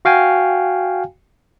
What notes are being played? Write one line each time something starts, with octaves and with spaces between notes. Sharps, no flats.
F#4 F5 G5 G#5